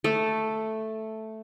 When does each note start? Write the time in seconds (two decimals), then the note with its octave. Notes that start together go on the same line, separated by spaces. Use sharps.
0.04 A3